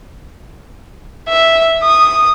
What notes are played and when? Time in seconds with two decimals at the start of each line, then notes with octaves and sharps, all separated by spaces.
1.28 E5
1.83 D#6